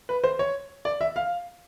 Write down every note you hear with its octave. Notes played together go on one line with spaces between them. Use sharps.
B4
C5
C#5
D5
E5
F5